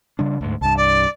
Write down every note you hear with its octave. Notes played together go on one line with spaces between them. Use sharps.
C#3 G3 D4
D2 G#2
C2 G2 A5
D5